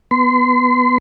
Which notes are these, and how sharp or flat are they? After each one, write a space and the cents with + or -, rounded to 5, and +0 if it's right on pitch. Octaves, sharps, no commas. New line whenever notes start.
B3 +0 C6 -35